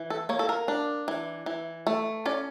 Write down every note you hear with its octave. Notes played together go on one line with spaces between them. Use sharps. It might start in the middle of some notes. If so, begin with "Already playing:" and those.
Already playing: E3
A4
A#3 C#5
A4
A#4
D4
E3
E3
A3
C#4 D5